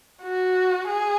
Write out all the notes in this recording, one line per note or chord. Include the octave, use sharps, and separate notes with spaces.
F#4
G#4